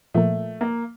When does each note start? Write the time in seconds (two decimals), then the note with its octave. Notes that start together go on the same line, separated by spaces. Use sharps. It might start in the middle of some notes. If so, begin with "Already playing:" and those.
0.14 A#2 F3 A3 A#3
0.61 A#3